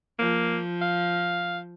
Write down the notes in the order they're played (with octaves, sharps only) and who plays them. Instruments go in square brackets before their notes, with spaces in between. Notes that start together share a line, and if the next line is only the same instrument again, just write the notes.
[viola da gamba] F3 [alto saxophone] A#3
[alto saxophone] F5